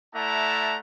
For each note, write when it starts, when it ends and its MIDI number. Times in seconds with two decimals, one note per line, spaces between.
0.15 0.78 57
0.15 0.78 64
0.15 0.78 74
0.15 0.78 78
0.15 0.78 81
0.15 0.78 82